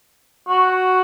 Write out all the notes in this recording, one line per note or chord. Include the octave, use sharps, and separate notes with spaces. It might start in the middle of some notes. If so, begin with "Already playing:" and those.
F#4